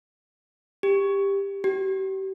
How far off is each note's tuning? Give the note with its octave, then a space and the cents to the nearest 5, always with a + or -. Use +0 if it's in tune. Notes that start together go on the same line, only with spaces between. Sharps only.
G4 +10
G4 -40